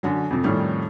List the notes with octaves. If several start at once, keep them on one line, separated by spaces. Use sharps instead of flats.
F#2 D3 F#3
F2 C3
F2 A2 D#3 G3 C#4